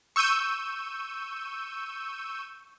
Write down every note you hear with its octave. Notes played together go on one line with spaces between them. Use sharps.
C#6 E6 G6 D#7